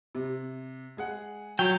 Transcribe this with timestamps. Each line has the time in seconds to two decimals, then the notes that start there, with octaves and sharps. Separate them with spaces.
0.15 C3
0.97 G#3 G#4 F#5
1.59 F#3 G5